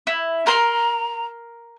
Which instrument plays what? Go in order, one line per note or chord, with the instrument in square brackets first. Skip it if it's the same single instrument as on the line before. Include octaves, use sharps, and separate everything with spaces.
[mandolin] E4
[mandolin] A#4 C6 [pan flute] A#5